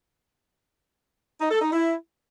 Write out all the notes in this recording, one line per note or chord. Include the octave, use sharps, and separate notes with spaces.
D#4
A4
D#4
E4